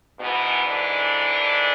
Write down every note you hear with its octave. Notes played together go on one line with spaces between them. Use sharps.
G#2 B2 E3 B3
D3 D4